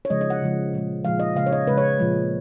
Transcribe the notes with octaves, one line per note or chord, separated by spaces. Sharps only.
C#5
C#3 F3 G#3 D#5
D#5
F#5
C#3 F3 G#3
A#2 F3 G#3
A#2 F3 G#3 F5
D#5
C#3 G#3 F5
C#5
D#5
C#3 G#3 B4
C#5
A#2 F3 G#3